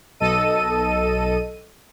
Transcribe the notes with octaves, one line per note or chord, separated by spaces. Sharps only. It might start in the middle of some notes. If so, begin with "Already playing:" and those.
B1 A4 D#5 D#7